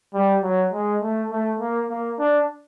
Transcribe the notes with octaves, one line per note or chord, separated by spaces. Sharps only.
G3
F#3
G#3
A3
A3
A#3
A#3
D4